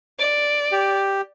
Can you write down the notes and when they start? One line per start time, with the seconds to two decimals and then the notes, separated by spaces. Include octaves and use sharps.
0.19 D5
0.72 G4